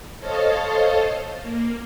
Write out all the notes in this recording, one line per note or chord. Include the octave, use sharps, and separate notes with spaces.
A4 C5 C#5 D#5 F5 A5
A#3